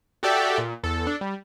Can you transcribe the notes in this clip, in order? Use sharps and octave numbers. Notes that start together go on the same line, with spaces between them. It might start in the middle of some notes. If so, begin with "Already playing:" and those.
F#4 G4 A4 D5 E5 G5
A#2
E2 A4
D4 A4
G3